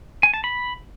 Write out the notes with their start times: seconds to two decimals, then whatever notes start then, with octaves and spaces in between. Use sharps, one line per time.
0.23 G#5
0.34 A5
0.44 B5